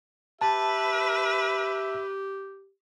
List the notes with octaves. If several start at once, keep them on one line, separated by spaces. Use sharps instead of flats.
G4 B4 E5 A5